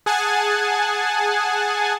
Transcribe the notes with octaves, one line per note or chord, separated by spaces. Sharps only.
G#4 F#5 G#5 A5